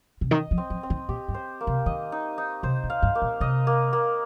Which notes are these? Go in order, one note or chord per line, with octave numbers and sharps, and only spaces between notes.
C3
D#3 D#5
F3
C4
F3
C4
D#3
A#2 G4
G2
C5
A#3
C3
D#3 D#5
D#4
D#4
C3 C5
A#2
F5
G2
A#3
A#2
C3 D#5
A#3
A#3